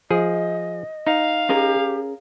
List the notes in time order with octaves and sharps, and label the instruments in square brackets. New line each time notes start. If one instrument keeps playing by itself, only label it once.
[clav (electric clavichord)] F3 G#4 [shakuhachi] D#5
[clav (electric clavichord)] D#4 [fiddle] F5
[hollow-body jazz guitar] C#4 G#4 A#4 [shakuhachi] G4